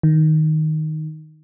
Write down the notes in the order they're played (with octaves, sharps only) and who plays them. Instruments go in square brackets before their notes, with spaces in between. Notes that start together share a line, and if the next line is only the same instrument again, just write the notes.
[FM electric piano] D#3